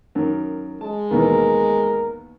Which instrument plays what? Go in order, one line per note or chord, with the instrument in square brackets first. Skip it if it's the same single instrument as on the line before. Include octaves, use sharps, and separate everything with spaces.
[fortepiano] F#2 D#3
[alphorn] G#3 [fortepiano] A5
[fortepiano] D#2 B2 E3 [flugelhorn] A#4